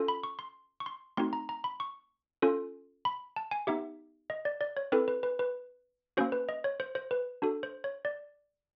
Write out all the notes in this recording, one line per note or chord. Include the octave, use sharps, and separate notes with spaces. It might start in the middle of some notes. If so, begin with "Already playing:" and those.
Already playing: C#4 F4 A4
B5
C#6
C6
C#6
C6
A3 C4 D#4 F#4 C6
A#5
A#5
B5
C#6
C#4 F4 A4
B5
A5
G#5
B3 D#4 G4 E5
D#5
D5
D5
C#5
C4 E4 A4 B4
B4
B4
B4
A#3 C#4 F#4 C5
B4
D#5
C#5
C5
C5
B4
D4 F#4 A4
C5
C#5
D5